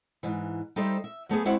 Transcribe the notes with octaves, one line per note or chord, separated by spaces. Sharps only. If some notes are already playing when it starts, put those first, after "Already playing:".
G#2 E3
G3 D#4 A4 C5 E5
E5
F#3 A3 B3 G#4
G#3 C4 E4 F#4 F#5